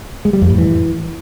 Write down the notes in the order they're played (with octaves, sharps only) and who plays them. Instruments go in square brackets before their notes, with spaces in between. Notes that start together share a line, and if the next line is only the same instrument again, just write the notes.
[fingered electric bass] G#3
G3
F2
A2
E3